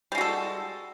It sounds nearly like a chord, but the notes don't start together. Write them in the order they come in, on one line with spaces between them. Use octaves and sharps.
G3 G#3 F#4 A4